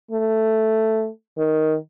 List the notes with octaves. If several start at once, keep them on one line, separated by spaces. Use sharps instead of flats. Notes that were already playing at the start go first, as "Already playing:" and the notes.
A3
D#3